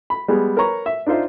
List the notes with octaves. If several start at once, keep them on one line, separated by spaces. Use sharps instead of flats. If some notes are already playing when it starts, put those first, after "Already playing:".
B5
G3 G#3 B3 G#4
A#4 B4 C#5 A#5 C#6
E5
D4 D#4 F4 C5 E5